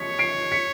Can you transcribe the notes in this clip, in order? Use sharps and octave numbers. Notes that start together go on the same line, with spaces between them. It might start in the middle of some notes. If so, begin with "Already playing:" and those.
Already playing: C#5 B6 C#7
C7 D7
B6 C#7